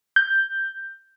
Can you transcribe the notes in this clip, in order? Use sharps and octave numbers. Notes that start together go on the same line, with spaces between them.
G6